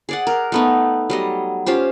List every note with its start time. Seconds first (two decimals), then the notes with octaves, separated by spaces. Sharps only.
0.09 G#4 D5 F#5
0.27 A#4
0.52 A3 B3 D#4
1.10 F#3 G3 D#5
1.66 C#4 F4 G4 C5